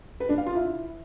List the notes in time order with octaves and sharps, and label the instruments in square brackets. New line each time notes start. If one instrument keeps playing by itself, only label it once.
[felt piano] B4
D4
F5
F4
E4